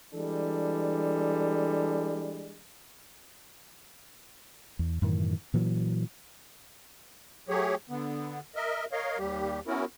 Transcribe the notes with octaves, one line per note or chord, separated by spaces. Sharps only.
E3 G3 G#3 D4 A4
E2
F#2 A2 D#3 E3
A#2 E3 F#3
F#3 A3 G4 G#4 C#5
D3 B3
A#4 D#5 E5
A#4 C#5 D#5 F5
D#2 G3 G4
B3 C#4 E4 F#4 A#4